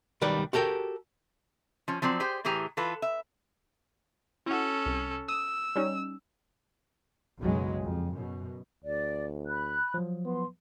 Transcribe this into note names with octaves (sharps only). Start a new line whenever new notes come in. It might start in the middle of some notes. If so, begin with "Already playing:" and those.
B1 D#3 G3 B4 D5
F#4 G4 A4 A#4 G5
F3 C#4
F3 F#3 C4 D5
G4 G#4 C5 G5
A2 E3 G4 G#4 A#5
E3 F4 A4 B4
E5
C#4 E4 F#4 A4
C2
D#6 E6
G3 C#4 D#4
F#1 B1 C#3 F#3 G#3
F2
F#2 B2
D2 D5
B5 F#6
F3 F#3
B3 C6